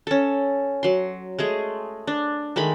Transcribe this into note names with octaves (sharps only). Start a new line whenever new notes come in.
C#4 A4
F#3 C6
G#3 A3 G#4
D4
D#3 G#3 A3 B5